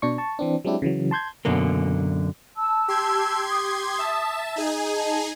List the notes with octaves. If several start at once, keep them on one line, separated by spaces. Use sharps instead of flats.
B2 D4 C#6
A5 C#6
E3 C4 D4
F#3 G#3 C4 D4 E4 G4
C#3 E3 F#3
A5 C6 G6 G#6
F#2 B2 D3 A#3
A5 E6
G4 C6 G#6
D#6
E5 A5
D#4 G#4 G#5
D#5 A5